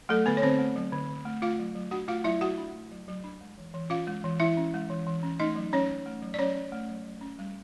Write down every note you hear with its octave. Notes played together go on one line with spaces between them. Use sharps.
F#3 A3 A4
D3 B3 B4
C#5
D3 C4 C5
A3
F#3
D3
D3
A3
A3 F4 F5
F#3
F#3
D4 F#4 F#5
A3 F4 F5
F#3 E4 E5
F#3 F#4 F#5
D4
A3
F#3
F#3
D4
G#3
E3
E3
C#4 F4 F5
G#3
E3
E3 E4 E5
C#4
G#3
E3
E3
C#4
A3 D#4 D#5
F#3
F#3 C#4 C#5
C#4
A3
F#3
D5
F#3 C#4 C#5
C#4
A3
F#3
F#3
C#4
G3